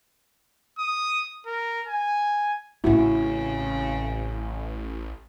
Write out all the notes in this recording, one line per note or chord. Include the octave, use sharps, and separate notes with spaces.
D#6
A#4
G#5
A1 A2 C#3 C4 E4 F#4